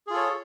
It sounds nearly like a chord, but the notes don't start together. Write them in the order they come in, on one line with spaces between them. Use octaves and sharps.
G#4 F4 A4 C#5